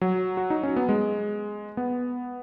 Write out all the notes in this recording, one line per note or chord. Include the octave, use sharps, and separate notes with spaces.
F#3
F#4
D#4
C#4
B3
G#3
B3